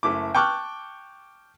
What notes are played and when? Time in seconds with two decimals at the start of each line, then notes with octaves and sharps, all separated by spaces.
0.03 F#1 A3 E4 D6
0.35 G5 A5 C#6 D6 F6 F#6